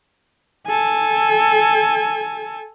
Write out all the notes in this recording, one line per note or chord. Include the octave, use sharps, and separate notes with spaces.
A4 G#5